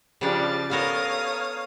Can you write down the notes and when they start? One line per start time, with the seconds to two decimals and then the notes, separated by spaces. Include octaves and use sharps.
0.21 C#3 F3 G3 D4 A6
0.71 B3 A4 A#4 C#5 F5 D#6